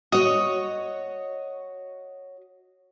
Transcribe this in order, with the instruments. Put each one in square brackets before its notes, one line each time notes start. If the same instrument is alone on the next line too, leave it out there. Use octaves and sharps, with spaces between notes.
[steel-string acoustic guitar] F#4 C#5 [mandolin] D#5